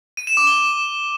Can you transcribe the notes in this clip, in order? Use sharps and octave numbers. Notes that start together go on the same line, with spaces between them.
D#7
E7
D6
G7